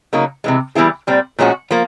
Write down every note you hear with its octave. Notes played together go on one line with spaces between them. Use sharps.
C#3 F#3 A#3 D#4
C3 E3 G#3
E3 G3 B3 E4 G#4
A#2 G3 C4
A#2 F3 G#3 C#4 F#4
F3 A#3